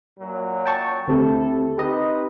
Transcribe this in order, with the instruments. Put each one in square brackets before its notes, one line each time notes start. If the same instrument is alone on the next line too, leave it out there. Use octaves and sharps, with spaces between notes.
[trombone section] F#2 A#2 F#3
[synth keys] G5 A5 C#6
[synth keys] D2 C4 G4 [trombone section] E4 A4
[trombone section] C4 D#4 B4 [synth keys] G4 D#5